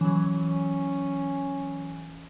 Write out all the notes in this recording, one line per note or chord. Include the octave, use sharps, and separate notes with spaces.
E3 F#3 C#4